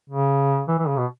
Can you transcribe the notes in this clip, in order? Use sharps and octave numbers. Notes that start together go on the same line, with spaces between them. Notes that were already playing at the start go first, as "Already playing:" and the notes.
C#3
E3
E3
C#3
B2